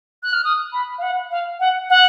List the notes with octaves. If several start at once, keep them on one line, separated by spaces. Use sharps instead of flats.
F#6
F6
D#6
B5
F5
F#5
F5
F#5
F#5